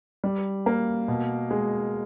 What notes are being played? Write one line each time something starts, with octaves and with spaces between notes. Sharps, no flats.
G3
A#3
B2
G#3